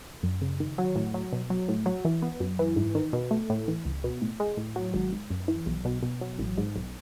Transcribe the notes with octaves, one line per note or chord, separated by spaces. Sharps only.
F#2
C#3
D#3
F#3
A2
F#3
B2
F#3
A2
F#3
E3
B3
F#2
E3
G#2
D#3
B2
A3
A2
E3
C#2
B2
A2
G#3
A2
F#3
G#1
G#2
F#2
E3
B1
B2
B2
F#3
A1
G#2
B1